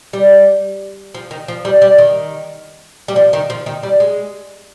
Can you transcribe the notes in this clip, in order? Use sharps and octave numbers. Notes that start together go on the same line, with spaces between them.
G3
F3
D#3
F3
G3
G3
D#3
G3
F3
D#3
F3
D#3
G3
G#3